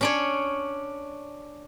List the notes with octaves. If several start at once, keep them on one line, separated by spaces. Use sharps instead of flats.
C#4 D4 C#5